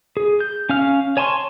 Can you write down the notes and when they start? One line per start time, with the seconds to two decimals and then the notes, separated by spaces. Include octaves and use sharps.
0.17 G#4
0.40 G6
0.69 C#4 F5 F6
1.17 C#5 G#5 A5 C6 C#6